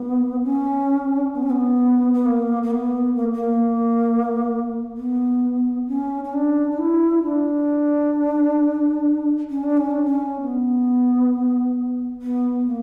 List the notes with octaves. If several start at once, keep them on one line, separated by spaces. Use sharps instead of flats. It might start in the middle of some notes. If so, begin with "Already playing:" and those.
Already playing: B3
C#4
B3
C#4
B3
B3
A#3
A#3
B3
A#3
A#3
B3
C#4
C#4
D4
D4
E4
D4
C#4
D4
C#4
D4
C#4
B3
B3
A#3